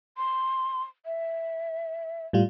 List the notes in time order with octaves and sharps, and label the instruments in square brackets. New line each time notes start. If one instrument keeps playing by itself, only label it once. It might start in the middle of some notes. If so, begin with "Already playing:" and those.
[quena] C6
E5
[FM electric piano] A2 G3 F4